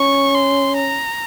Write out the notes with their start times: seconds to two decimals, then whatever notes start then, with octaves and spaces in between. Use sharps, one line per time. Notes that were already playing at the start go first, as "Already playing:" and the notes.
Already playing: C#4 C#6
0.35 C6
0.77 A#5